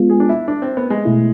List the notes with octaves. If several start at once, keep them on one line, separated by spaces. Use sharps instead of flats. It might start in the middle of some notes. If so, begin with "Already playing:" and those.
Already playing: G#3 B3 F4
G#4
D4
E4
D4
C4
B3
G#3
B2 A3 E4